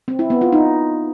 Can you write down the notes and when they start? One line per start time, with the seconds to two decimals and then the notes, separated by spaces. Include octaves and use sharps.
0.08 C4
0.19 E4
0.30 B3
0.41 F4
0.53 D#4